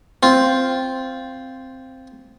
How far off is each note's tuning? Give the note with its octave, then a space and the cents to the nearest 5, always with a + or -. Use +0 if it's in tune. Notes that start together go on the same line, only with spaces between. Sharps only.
C4 +0 F4 +0